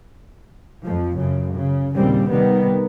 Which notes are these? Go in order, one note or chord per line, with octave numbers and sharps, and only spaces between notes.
F2 F3
F#2 C#3
C#3
D#2 A#2 C#3 G3 C4
C3 D#3 G3 B3